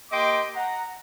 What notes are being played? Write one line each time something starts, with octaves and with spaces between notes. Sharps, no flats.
A#3 G4 D#5 G5 C6 D6
F#5 A#5